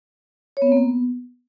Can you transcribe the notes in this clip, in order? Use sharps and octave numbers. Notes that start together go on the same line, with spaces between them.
C#5
B3
C4
A#3
B3